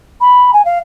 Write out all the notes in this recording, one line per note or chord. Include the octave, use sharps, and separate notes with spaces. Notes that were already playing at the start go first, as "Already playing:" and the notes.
B5
G#5
F5